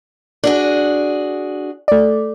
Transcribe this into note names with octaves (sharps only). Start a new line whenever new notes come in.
D4 F#4 G#4
A3 D5